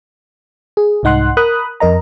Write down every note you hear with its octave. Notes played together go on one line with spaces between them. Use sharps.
G#4
C2 G#2 D#4 F#5 C6 F#6
A#4 B5 D#6 F#6
F2 A#4 D#5 A#5